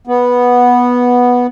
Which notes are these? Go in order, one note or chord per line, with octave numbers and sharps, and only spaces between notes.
B3